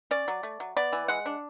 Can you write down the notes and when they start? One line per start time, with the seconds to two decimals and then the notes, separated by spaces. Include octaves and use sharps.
0.11 C#4 D5
0.28 F#3
0.43 A3
0.60 F#3
0.76 B3 D5
0.93 E3
1.08 G#3 F#5
1.26 D4